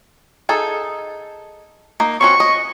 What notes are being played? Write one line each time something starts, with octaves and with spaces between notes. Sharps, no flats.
D#4 G#4 A4
A#3 D#4
C4 C#4 F#4 C#6
D#5